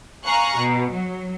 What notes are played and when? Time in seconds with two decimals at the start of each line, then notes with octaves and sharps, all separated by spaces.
0.25 F5 G#5 A#5 C#6 F#6
0.58 B2
0.93 F#3